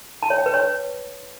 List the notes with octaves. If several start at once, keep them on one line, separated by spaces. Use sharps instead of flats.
A5
C#5
G5
B4
C#5